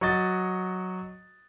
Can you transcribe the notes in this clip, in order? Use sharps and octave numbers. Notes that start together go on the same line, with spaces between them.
F#3 F#4 D#5 A6